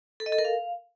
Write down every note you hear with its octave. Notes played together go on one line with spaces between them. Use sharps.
A4
D#5
A4
A#4
F5